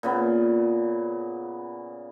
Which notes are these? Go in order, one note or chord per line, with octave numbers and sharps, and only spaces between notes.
A#2 C#3 B3